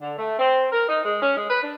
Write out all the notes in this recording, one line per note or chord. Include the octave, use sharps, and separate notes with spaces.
D3
A3
C4
A#4
D#4
G#3
C#4
G#3
B4
D4